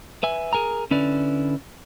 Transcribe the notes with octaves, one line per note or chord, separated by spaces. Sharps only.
B4 E5 G#5
G#4 A#4 G#5 A#5
D3 C#4 E4 B4 D5